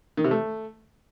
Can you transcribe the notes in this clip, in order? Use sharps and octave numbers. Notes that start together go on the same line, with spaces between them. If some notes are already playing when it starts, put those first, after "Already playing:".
D#3
C3
A3